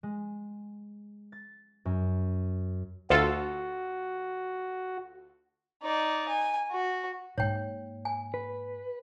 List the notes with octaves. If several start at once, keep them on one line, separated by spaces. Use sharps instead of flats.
G#3
A6
F#2
D2 F4 F#4 A4
D#4 D5
G#5
F#4
G#2 A#3 C#5 G5
G#5
B4